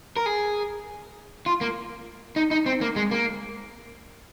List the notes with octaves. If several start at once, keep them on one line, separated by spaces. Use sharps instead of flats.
A#4
G#4
F4
A#3
D#4
D#4
C4
A#3
G#3
A#3